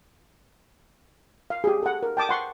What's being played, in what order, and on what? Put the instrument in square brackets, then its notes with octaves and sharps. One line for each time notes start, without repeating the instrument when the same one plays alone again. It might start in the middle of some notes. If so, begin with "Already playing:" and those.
[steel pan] F5
G4 G#4
A4 F#5
A#4
G5 A5 D6 D#6
F#5 C6 C#6